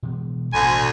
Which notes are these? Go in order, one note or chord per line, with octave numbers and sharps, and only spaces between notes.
B2 E3 B3
A1 D2 B2 G#5